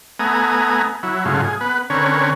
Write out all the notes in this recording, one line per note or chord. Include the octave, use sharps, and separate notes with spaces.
A3 B3 G#5 A#5 D#6
F#3 E4
G#2 C#3 F#3 A3 F4
G#4
B3 B4
D3 C4 C#4 A#4 B4 C#5